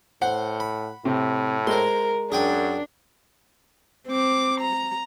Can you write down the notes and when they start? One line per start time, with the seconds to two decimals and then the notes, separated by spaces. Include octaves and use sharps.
0.22 A2 C5 F#5
0.60 B5
1.05 A2 C3
1.67 G#3 A#4 C5 C6
2.32 F#2 D4 G#4 G5 G#5
4.08 C4 D6
4.61 A#5